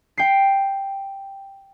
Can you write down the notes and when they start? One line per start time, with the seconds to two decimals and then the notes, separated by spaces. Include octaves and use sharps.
0.18 G5 C7